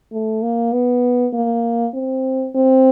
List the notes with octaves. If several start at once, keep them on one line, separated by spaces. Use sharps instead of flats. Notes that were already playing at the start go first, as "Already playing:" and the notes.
A3
A#3
B3
A#3
C4
C4